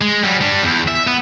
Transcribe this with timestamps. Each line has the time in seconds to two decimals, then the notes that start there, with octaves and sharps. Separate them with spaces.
0.01 G#3
0.23 F#3 G3
0.41 G3 D4
0.62 E2
0.88 E5
1.07 B3